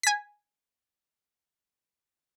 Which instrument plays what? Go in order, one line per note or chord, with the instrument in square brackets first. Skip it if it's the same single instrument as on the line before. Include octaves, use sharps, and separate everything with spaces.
[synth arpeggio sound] G#5 B6